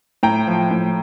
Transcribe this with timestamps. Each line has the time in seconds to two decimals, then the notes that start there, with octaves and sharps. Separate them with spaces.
0.23 A2 G5 A#5
0.47 F3
0.71 A2